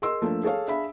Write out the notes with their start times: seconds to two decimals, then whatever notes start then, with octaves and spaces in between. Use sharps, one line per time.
0.02 G#4 A#4 D#5 C6 E6
0.22 F3 A3 A#3 D4
0.43 G#4 A4 C#5 F5
0.68 D4 G#4 E5 F5 B5